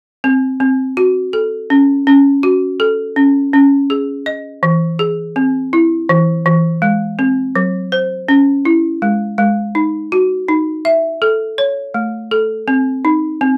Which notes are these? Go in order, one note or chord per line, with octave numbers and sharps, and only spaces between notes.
C4
C4
F#4
A4
C#4
C#4
F#4
A4
C#4
C#4
G#4
D#5
E3
G#4
C4
E4
E3
E3
G#3
C4
F#3
C5
C#4
E4
G#3
G#3
D#4
F#4
D#4
E5
A4
C#5
A3
A4
C4
D#4
C4